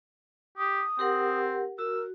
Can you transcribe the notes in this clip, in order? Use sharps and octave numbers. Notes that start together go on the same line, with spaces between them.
G4 D#6
C4 G4 A#4 F#5
F#4 A#4 E6